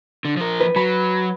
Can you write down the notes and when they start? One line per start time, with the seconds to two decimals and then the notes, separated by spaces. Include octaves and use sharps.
0.25 D3
0.37 F3 A#4
0.60 B4
0.76 F#3 B5